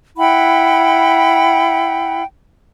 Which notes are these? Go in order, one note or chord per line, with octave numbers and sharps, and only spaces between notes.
E4 F#5 G5 B5